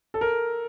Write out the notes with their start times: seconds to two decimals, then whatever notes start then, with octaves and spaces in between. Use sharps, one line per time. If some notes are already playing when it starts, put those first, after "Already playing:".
0.14 A4
0.21 A#4